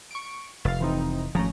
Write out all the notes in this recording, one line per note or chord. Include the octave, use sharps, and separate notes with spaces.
C#6 D7
F1 F5 A6
E3 C4 D#4
G#1 F3 A3 C#4 A#5